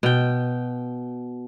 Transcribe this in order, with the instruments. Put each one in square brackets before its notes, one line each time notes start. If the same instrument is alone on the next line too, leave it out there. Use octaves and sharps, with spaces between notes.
[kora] B2 G5